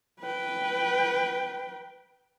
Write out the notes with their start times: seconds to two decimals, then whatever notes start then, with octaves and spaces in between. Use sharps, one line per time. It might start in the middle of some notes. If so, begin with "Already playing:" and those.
0.21 B4 G5